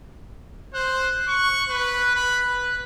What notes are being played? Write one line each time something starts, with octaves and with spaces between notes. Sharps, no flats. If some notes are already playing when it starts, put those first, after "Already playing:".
C5 F#6
C#6
B4
B5
B4